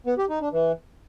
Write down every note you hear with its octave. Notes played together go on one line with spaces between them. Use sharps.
B3
G4
D#4
D4
E3